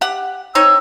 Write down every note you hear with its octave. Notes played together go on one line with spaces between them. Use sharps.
G4 F#5
C4 D#4 C#5 E6